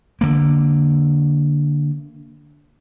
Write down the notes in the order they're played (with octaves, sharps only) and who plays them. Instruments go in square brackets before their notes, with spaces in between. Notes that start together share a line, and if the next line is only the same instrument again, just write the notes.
[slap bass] D3 A#3